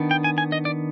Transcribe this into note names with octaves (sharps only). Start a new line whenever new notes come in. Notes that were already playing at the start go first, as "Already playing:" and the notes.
Already playing: D#3 B3 D4
G5
G#5
G#5
D#5
D5